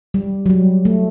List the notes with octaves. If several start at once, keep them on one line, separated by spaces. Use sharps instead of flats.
G3
F#3
G3
A3